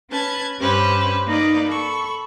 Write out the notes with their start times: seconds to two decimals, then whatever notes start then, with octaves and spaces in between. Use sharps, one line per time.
0.11 C#4 B4 A5 G#6
0.60 G2 C#4 G4 B4 C5
1.27 A#3 D#4 B4 D5
1.67 A4 B5 C#6